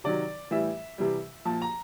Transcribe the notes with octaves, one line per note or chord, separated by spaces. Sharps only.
C3 D#3 F#3 D5
A2 E3 G3 E5
C3 E3 G3
A#2 F3 A5
A#5